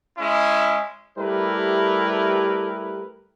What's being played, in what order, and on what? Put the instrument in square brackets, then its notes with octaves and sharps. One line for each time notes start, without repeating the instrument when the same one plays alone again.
[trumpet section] G#3 C#4 E4
[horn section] G3 A3 E4 G4 A#4 B4